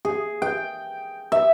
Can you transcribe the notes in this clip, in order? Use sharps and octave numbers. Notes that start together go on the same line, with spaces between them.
G#4
G5
E5